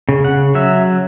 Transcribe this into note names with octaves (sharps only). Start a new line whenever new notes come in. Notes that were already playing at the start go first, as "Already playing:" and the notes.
C#3
F#5
F#3 E5